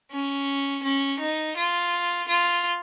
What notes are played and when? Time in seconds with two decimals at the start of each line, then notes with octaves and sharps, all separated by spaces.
0.11 C#4
0.83 C#4
1.20 D#4
1.57 F4
2.28 F4